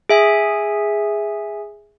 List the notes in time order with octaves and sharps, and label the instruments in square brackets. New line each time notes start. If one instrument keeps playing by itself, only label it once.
[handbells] G#4 E5 G#5